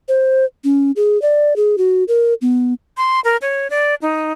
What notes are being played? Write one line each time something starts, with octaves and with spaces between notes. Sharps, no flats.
C5
C#4
G#4
D5
G#4
F#4
A#4
B3
C6
A#4
C#5
D5
D#4